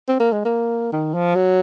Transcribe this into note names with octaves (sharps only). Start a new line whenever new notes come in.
C4
A#3
G#3
A#3
D#3
F3
F#3